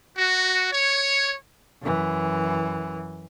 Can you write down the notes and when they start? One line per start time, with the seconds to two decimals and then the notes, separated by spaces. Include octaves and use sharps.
0.18 F#4
0.72 C#5
1.81 F#2 E3